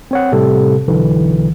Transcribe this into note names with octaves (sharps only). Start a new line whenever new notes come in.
C4 C#5 F#5
A2 C3 G3 A4
B1 D3 E3